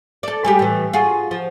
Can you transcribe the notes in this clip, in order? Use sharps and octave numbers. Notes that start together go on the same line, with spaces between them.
A4 D5
G3 G#3 G4
A2 E3
F4 F#4 G#4
F3